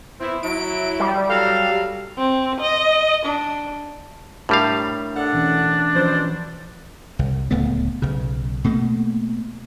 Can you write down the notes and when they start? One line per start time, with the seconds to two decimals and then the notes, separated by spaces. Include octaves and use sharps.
0.20 B3 C4 E4
0.43 F#3 E4 D7
1.00 G3
1.29 F#3 A4 F5
2.18 C4
2.60 D#5
3.25 D4
4.49 A2 G3 D4 G4 A#4 F5
5.16 D4 A4 F#5
5.33 B2 E3 C#4
5.95 B2 E3 F3 C#4 C5
7.19 C2
7.51 D1 C#2 A3 B3
8.02 B1 C#3
8.64 B2 A3 A#3